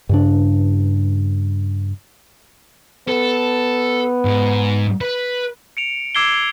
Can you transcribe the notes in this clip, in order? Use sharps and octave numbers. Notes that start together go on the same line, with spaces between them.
G2 C#3 D4
B3 A4
G#2
B4
C#7 D7 F7
D6 E6 G#6 C7 D7 G7